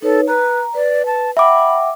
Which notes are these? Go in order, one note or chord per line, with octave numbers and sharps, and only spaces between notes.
D#4 A4 B4 C#5
B4 A#5
B4 D5
A5
E5 F#5 G5 B5 D6